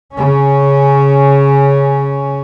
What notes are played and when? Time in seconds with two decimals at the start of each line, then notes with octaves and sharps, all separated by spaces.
0.14 C#3 C#4